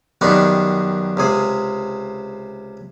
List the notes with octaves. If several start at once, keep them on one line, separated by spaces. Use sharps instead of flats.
F#2 D#3 G3 B3 D4 D#4
C#2 C3 G#4